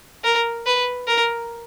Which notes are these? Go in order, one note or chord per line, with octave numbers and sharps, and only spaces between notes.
A#4
B4
A#4